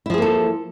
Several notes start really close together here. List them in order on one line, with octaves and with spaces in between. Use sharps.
E4 F3 G#4 A#3 A4